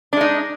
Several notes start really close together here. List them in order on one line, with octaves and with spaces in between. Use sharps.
D4 G#3 D#4